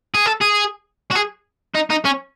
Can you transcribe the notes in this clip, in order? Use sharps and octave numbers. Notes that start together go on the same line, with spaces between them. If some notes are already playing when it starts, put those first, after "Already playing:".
G#4
A4
G#4
F#4
G#4
D#4
D#4
C#4